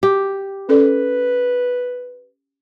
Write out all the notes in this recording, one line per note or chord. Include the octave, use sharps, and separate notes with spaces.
G4
C#4 A4 B4 D5